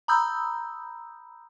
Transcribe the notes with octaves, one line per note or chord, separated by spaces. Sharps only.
A#5 B5 D#6 E6 G6